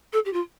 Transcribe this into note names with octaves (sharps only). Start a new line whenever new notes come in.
A4
G4
F4